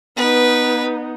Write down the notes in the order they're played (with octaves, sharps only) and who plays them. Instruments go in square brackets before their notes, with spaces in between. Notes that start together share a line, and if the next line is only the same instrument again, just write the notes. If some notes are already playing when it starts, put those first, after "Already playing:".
[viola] B3 D#4 [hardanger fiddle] B4